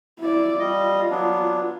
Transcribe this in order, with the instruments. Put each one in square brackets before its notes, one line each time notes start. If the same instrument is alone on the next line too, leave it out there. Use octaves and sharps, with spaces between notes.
[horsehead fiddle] E4 D5
[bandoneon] G3 D#5 [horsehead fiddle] F4
[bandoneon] F#3 B3 D4